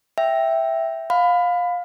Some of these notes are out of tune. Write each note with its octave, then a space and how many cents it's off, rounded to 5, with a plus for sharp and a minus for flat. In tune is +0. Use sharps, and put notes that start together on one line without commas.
E5 +0 G5 +0
F5 +20 B5 +20